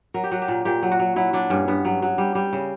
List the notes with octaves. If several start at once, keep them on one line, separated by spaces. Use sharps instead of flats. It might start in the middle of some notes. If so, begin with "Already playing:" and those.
F#3 A#4
G4
F#3 F#4
G4
A#2
A#2 G4
F#3
F#4
F#3
F#3 E4
F#3 D4
G2 C#4
G2 B3
F#3
F#3
G3
G3
C#3